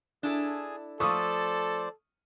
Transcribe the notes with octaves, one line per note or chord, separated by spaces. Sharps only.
D4 E4 G#4 A4
F3 A3 A4 C5 D5 C#6 D#6